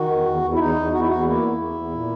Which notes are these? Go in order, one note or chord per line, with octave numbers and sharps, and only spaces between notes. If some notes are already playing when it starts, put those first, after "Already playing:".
Already playing: D#3 F#4
E2
E2
E2
E4
E2 D#4
E2
E2 F#4
E4
E2 F#4
A#3 E4
E2
E2
E2
A#2